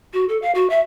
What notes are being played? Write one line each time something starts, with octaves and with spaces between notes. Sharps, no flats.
F#4
A4
F5
F#4
E5